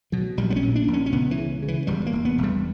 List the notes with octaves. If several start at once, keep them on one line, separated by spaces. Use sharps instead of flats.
B2 F#3
A#1 G3
B3
C#4
A#2
D4
A#1
C#4
C#4
C#2 B3
E3
C#3
C#3
E3
E1 G3
A#3
E1
B3
E1
G3